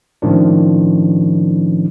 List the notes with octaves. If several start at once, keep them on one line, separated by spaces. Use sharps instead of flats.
A2 D#3 F3 G#3 C#4 D4